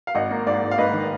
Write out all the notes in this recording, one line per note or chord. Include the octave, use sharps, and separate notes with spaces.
F5
G#1 D#5 F#5
A#3
G#2 D5 F5
G#1
F5
G#2 B4 D#5
D#3